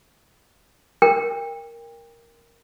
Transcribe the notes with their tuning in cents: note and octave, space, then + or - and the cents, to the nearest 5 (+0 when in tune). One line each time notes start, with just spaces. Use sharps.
A#4 +0 G5 +30